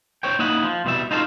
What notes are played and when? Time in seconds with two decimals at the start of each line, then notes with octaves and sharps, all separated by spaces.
0.23 C5 C#5 G5
0.39 A#3 D#4 E4 D#5 F#5
0.64 F3
0.85 C2 B2 G3 E5
1.11 D#4 F4 F#4 A4 C5 F5